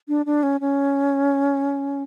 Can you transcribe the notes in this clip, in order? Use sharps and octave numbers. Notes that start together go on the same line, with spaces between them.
D4
D4
C#4
C#4